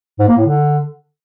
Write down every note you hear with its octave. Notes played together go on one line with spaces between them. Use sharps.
G#2
A#3
A2
D3